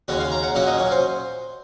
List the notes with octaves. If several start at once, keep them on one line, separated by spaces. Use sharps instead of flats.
D#2 C#3 G#3 C#4 F#4
F5
A#5
F#5
A#2 F#3 A#3 C#4 F#5
D#5
C#5
C5